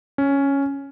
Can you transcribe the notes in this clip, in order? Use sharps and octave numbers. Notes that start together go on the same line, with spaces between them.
C#4